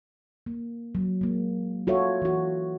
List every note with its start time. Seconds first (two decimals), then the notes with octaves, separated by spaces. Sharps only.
0.46 A#3
0.95 F#3
1.21 G#3 A#3
1.87 F4 F#4 A4 C#5 E5
2.22 E3 F#4